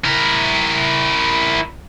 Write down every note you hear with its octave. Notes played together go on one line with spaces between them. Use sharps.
E4 A#4